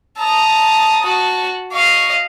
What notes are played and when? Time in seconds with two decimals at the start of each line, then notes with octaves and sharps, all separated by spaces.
0.18 A5 A#5 D#6
1.03 F#4 A5
1.72 D#5 F5 C#6